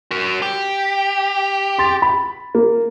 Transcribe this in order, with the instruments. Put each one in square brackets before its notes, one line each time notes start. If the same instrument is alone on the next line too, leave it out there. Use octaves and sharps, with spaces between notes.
[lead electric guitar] F#4 A#4
G4
[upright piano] C6 A6
B5
A#3